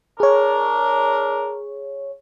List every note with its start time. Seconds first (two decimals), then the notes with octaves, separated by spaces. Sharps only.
0.20 D4 G#4 A#4 C#5